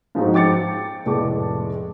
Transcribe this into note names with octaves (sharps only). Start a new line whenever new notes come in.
G#2 F3 G#3 C4 D#4 F#4
G5 D6 A6 C#7
F1 A2 G#3 A5 D6